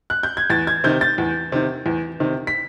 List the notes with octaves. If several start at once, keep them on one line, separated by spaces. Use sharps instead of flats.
F#6
G6
G#6
E2 A6
G#6
C3 D#3 G6
A6
E2
C3 D#3
E2
C3 D#3
B6